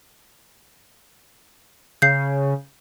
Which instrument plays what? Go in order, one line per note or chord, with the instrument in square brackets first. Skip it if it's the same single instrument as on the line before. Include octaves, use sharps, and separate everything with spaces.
[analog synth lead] C#3 [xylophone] G6 C7